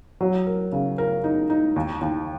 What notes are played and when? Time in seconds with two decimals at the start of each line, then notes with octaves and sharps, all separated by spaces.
0.21 F#3
0.47 A#4
0.73 C#3
0.98 A#4
1.24 D#4
1.50 D#4
1.76 D#2
2.01 D#2